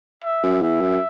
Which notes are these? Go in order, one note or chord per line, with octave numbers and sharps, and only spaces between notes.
E5
F#2
E2 E5
F#2